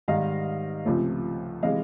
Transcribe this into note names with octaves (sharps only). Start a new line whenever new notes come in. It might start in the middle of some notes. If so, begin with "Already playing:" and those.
G#2 D#3 G3 D#5 F5
C#2 C3 F3 A3
C3 E3 G#3 D#5 F5